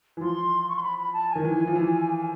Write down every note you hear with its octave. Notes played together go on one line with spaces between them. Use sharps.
E3
F3 C6
C#6
C6
B5
B5
A5
G#5
D#3
E3
E3
F3
E3